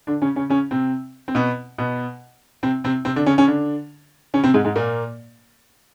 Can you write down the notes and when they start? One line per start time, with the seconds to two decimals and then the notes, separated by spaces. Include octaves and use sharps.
0.07 D3 D4
0.22 C#3 C#4
0.35 C#3 C#4
0.50 C#3 C#4
0.71 C3 C4
1.28 C4
1.35 B2 B3
1.78 B2 B3
2.63 C3 C4
2.84 C3 C4
3.05 C3 C4
3.16 D3 D4
3.26 C#3 C#4
3.38 C#3 C#4
3.47 D3 D4
4.34 C#3 C#4
4.44 C3 C4
4.54 G#2 G#3
4.65 G#2 G#3
4.76 A#2 A#3